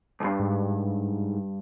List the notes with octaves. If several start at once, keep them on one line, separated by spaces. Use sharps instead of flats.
B1 G2
G#2